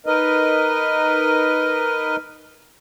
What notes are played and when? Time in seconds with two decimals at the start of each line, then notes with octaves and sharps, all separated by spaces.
0.06 D#4 A#4 B4 D#5